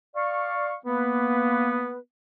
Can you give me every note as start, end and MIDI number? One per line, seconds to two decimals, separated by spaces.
0.16 0.75 74
0.16 0.75 77
0.16 0.75 85
0.85 1.98 58
0.85 1.98 59
0.85 1.98 71